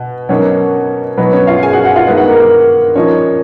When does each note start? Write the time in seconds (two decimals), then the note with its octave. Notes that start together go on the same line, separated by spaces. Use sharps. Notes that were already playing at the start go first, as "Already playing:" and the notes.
Already playing: B2
0.29 B2 F#3 A#3 C#4 D#4 C#5
1.18 B2 F#3 B3 D#4 B4
1.33 C#4 C#5
1.47 F4 F5
1.63 G#4 G#5
1.73 F#4 F#5
1.79 G#5
1.84 F#4 F#5
1.96 F4 F5
2.07 D#3 G#3 B3 D#4 D#5
2.17 F#4 F#5
2.28 A#3 A#4
2.40 A#3 A#4
2.95 A#2 F3 A#3 C#4 D#4 C#5